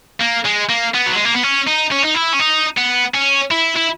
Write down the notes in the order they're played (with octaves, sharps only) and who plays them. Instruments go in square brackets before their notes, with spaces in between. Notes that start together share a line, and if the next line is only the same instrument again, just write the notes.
[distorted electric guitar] A#3
G#3
A#3
B3
F#3
G#3
A#3
B3
C#4
D#4
C#4
D#4
E4
C#4
D#4
B3
C#4
E4
E4